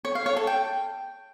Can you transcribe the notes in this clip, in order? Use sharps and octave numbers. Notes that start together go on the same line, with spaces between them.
C#5
F5
C#5
A4
G5